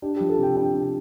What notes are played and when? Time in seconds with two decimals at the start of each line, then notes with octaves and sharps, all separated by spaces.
0.02 D4 G4
0.16 G4
0.20 F3
0.29 A4
0.38 C3 G5
0.56 D4 G5
0.74 C3